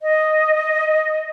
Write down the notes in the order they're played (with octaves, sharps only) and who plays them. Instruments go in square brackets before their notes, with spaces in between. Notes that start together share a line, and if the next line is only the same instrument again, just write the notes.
[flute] D#5